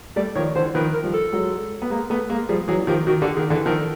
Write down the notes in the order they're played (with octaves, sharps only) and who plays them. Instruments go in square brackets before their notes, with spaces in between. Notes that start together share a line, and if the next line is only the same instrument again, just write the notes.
[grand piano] G3 A3 [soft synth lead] D5
[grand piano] D#3 F3 [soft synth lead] C#5
[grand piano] D3 E3 [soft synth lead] C5
[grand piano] D#3 F3 [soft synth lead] B4
[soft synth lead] A#4
[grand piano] F3 G3
[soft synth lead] A4
[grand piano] F#3 G#3
B3
G#3 A#3
A3 B3
G#3 A#3
[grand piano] F3 G3 [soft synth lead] G#4
[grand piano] E3 F#3 [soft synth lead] G#4
[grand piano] D#3 F3 [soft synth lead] G4
[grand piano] D#3 [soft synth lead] F#4
[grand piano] D3 [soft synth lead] G4
[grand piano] D#3 [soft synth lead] G#4
[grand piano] D3 E3 [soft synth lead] A4
[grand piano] D#3 F3 [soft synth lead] A4